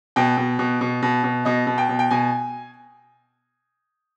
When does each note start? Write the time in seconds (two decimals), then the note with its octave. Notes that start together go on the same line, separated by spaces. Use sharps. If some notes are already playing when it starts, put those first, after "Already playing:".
0.16 B2 G5
0.37 B2
0.59 B2
0.81 B2
1.02 B2
1.24 B2
1.45 B2 D#5
1.67 B2
1.78 G5
1.89 B2
1.99 G5
2.11 B2 G#5